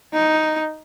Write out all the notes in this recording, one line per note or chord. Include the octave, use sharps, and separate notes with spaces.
D#4